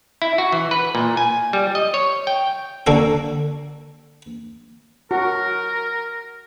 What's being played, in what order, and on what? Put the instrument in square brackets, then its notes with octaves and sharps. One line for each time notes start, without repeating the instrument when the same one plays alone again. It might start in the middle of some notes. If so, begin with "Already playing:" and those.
[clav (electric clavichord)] E4
F#4
E3
B4
A#2
G#5
G3
D#5
C#5
G5
[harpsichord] D3 A#3 F#4 A4
[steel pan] F#4 [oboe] A#4